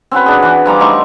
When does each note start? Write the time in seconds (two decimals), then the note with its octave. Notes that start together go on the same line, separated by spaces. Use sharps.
0.11 C4 C#4 F#4 B4
0.26 D4 G#4
0.43 E3 F#4
0.66 F3 G3 A#5 D6
0.80 A3 D#4 C6 C#6